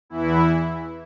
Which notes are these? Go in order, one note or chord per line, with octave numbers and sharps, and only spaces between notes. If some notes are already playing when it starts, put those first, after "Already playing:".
E2 E3 E4